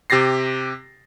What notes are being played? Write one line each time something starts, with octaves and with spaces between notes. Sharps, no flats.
C3 G4 A6 A#6 C7